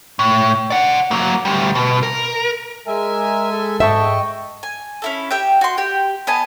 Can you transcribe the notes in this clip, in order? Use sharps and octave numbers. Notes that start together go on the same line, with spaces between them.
A2
D5 F#5
F#3 A#3
D2 G3
B2
A#4
G#3 A#4 E5 G#5
A4
G#2 D#5 E5 G5 A5 C#6 D#6
G#5
C#4 E4 A4
G4 E5 G5
F#4 C6
G4 G5
B3 D#5 G#5 A5